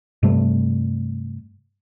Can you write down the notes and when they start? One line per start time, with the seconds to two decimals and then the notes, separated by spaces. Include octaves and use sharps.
0.23 G2 C3 G3 A3